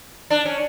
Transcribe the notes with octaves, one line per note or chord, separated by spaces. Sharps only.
D4
C#4